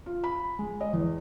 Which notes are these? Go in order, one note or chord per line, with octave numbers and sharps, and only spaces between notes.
F4
B5
G#3
D#5
E2